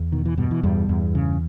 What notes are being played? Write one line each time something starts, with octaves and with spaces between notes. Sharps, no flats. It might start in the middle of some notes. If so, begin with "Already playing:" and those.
Already playing: E2
B2 D#3
E3
G2 B2 G3
E3
E2 G2 G3
E2
C#3